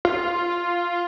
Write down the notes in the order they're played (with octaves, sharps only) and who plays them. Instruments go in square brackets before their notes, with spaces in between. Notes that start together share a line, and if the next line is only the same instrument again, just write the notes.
[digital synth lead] F4